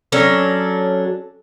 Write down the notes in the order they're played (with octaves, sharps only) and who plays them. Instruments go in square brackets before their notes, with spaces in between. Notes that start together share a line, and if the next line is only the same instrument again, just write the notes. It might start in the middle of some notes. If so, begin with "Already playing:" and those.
[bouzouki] F#3 C#4 D4 A4